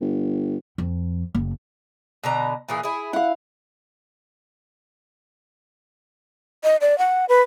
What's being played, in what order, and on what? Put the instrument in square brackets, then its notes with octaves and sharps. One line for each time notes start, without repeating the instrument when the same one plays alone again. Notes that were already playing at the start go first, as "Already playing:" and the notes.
[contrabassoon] G1
[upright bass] F2
F#1
[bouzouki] B2 D3 A#5
A#2 E3 G#4
E4 G#4
[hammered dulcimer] E4 F5 [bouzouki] F#5
[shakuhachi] D#5
D5
F#5
B4